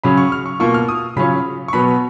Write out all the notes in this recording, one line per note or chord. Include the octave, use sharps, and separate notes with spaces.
C#3 F#3 C#4 B5
C#6
F6
C#6
B2 A#3 F4 C#6
F6
D#6
C#3 F#3 C#4 F4 B5
C#6
B2 F#3 B3 B5